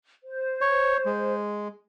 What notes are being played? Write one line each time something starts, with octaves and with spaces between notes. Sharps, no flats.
C5
C#5
G#3